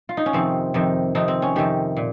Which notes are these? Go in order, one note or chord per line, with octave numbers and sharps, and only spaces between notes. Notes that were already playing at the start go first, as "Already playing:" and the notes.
F4
D#4
C#4
F2 C3 D#3 C4
F2 C3 D#3
F2 C3 D#3 D#4
C4
C#4
F2 C3 D#3 G4
A#2